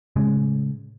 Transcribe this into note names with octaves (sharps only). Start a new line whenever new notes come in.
A2 C#3 G#3